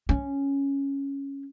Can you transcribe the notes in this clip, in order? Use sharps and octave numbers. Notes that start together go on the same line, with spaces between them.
C#4